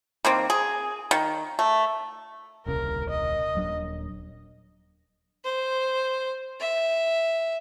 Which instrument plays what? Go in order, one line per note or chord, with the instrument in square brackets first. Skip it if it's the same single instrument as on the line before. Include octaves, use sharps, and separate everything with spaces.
[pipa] D#3 A#3 C4
G#4
D#3
A3
[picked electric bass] D#1 C2 C#3 [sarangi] A#4
[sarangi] D#5
[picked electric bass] D#1 F#3 D4
[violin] C5
E5